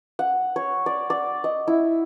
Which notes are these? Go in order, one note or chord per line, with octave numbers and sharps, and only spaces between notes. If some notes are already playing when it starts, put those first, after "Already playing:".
F#5
C#5
D5
D5
D#5
E4